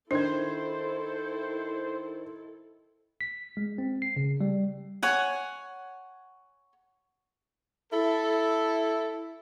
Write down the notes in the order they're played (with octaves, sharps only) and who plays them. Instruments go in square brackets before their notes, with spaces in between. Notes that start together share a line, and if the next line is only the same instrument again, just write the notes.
[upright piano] D#3 G#6 [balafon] D4 [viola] E4 A4 [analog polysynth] C5
[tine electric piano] B6
G#3
C4
C7
C#3
G3
[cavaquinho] C#5 F#5 G#5
[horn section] E4 A4